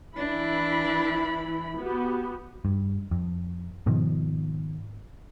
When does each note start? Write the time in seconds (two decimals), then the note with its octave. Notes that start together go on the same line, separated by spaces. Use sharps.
0.16 E3 D4 E4 B5
1.79 B3 F#4 G4
2.65 G2
3.11 F2
3.86 G#2 B2 D#3 F3